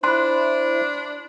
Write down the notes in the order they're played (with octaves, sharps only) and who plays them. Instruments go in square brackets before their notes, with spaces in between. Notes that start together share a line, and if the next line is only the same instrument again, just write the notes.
[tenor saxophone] D4 [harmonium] E4 C5 [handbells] B5 F#6 [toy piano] C6